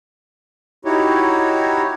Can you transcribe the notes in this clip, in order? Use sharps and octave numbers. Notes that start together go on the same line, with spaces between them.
D#4 E4 F#4 G4 C#5